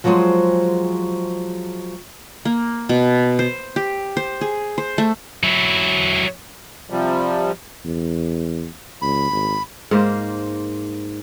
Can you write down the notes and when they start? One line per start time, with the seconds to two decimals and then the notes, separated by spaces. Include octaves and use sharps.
0.04 F3 F#3 G#3 G#4 C5
2.45 A#3
2.89 B2
3.39 C5
3.76 G4
4.17 C5
4.41 G#4
4.78 C5
4.98 A3
5.43 F#3 E4
6.90 C3 F3 G3
7.85 E2
9.02 C#2 B5
9.31 G#1
9.91 G#2 A#3 C5